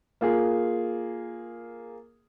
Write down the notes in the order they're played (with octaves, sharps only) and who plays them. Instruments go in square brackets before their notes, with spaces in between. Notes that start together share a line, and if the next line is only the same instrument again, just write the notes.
[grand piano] A#3 F4 G#4